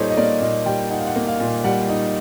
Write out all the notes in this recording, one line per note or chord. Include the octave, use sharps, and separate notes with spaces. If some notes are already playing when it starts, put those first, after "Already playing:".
Already playing: A#2 G3 D#4 A4 C5 C#5
D#5
A#3 D5
A#2 D#5
G3 G5
D#4 F#5
F5
F#5
A#3
F5
A#2
G3 F#5
D#4